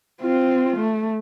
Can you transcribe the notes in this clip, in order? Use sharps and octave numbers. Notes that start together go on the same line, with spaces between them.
C4 F4
A3